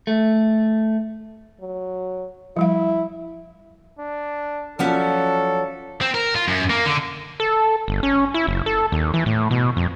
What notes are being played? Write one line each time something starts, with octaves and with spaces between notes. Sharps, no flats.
A3
F#3
F3 G3 E4 F5
D4
F3 F#3 C#4 A4 D5 F#5 B6
C4
A#4
F4
F#2
A#3
D3
A4
G1
C#4
E4
F#1
A4
D#2
E3
A2
B2
F2